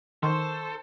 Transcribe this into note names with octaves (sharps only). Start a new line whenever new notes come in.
D#3 A4 C5 C6 C#6